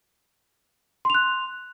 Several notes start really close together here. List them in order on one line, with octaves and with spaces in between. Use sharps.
C6 F7 F#6